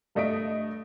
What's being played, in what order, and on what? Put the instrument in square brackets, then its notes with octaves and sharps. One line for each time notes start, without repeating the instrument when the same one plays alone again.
[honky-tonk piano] G2 A3 D#5 B6 D7